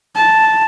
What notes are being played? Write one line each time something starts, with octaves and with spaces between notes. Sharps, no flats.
A5